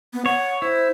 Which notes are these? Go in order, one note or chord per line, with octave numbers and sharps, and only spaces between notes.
B3
C#5 F#5
E4 C5